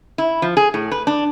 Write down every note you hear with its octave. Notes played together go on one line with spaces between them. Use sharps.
E4
F3
G#4
A2
B4
D4